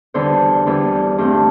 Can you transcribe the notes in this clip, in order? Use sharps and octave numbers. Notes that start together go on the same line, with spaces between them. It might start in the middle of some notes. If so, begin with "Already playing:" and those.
E2 D3 G3 C5
E2 D3 G3
G2 E3 A3 C4